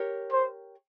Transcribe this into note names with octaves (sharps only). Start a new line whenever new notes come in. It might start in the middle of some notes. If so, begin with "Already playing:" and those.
Already playing: G4 A#4 C#5
C5